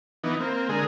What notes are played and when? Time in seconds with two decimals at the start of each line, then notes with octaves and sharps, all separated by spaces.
0.24 E3 B3 D#4
0.40 A#3 C4
0.69 D3 G#3 G#4 A#4